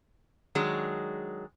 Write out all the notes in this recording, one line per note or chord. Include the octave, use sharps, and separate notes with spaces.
D#3 F#3 G#3 D4 G#4